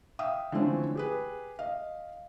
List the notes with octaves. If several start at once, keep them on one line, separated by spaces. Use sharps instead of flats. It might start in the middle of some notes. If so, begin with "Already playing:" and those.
E5 F5 G5 D#6
D3 E3 F3 A3 C4 C#4
G4 G#4 B4
D#5 F5